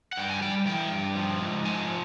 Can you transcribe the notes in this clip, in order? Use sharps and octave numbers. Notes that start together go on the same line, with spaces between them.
F#5
G2 G5
G#5
G3 G5
E3 G5
G2
F3
G#2
F3 G#5